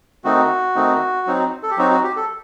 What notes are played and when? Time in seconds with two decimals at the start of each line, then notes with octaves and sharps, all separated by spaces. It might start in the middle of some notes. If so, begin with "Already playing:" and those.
0.24 D#3 A3 C4 D#4 F#4
0.75 D#3 A3 C4 D#4
1.27 F#3 C4 D#4
1.63 A4
1.70 G4
1.78 F#3 C4 D#4 F#4
1.91 F#4
2.03 G4
2.16 A4